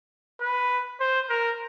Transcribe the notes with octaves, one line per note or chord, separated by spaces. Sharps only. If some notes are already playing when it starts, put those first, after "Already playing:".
B4
C5
A#4